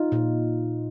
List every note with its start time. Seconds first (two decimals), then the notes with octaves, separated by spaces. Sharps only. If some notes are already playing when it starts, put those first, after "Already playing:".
Already playing: D#4 F4
0.12 A#2